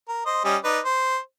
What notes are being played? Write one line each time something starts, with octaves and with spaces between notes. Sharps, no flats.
A#4
C5 D#5
G3 C#4 D#5
D#4 B4 D5
C5